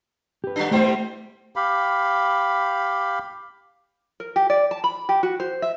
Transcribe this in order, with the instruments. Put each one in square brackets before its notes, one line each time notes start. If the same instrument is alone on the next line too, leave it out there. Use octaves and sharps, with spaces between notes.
[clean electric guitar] G4 B4
[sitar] G3 D4
[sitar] G3 B3 C5 [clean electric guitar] A3 E4 G4
[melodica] G4 F5 B5
[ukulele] A#4
G4
D5
A5
B5
G4
F#4
C5
E5